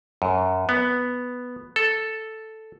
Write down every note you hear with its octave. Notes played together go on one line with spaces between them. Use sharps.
F#2
B3
A4